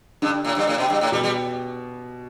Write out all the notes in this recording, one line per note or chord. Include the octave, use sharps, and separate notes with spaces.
G2 D3 D4
A2
G2
A2
B2
G2
A2
B2 G3 B3
G3